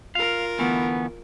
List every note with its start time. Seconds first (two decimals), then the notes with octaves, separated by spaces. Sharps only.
0.15 F4 A#4 F5
0.59 D2 E3 A3 B3